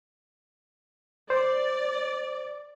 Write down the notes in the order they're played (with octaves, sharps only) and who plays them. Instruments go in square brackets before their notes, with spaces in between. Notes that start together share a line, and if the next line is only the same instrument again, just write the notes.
[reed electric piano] C5 [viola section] D5